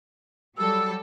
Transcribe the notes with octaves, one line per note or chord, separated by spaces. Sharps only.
F#3 G3 A4 E6